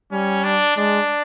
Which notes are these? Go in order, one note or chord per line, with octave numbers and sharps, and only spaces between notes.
G3 C#4
D4
G#3 D4